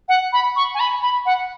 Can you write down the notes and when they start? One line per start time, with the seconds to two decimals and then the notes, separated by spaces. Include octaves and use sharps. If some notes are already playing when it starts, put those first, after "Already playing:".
0.08 F#5
0.32 B5
0.56 C#6
0.74 G#5
0.79 B5
1.02 B5
1.25 F#5